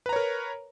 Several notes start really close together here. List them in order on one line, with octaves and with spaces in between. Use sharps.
B4 A#5 C#5 A#4